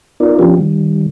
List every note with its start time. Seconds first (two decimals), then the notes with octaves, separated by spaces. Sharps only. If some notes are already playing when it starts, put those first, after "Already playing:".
0.20 B3 D#4 F4 A#4 D5
0.39 F3 B3 C#4 D4 F4 G4
0.58 D#3 G3